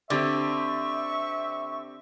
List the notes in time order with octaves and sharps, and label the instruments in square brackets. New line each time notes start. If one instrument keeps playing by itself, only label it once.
[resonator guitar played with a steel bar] D3 [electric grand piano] C4 G4 D5 [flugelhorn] E5 [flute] C#6